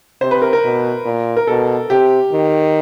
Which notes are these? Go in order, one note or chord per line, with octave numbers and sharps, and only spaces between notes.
C3 C5
B4
A#4
A#4
B2
A#2
A#4
B2 A4
C3 G4
D#3